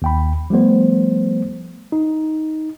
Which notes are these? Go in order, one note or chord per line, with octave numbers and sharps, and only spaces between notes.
D#2 G5 B5
F3 G3 A3 B3 C5
D#4